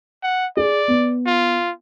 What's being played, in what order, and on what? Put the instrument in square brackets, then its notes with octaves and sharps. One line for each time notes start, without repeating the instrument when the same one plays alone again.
[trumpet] F#5
[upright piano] G#4 [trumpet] D5
[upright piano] B3
[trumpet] F4